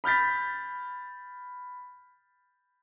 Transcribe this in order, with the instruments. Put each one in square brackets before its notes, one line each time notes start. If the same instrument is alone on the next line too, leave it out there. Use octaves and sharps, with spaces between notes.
[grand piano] B5 F6 G6 A6 B6